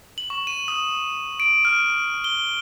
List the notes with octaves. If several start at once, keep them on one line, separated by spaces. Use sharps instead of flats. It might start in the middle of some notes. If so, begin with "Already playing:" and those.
F#7
C#6
D#7
D#6
D7
F6
G7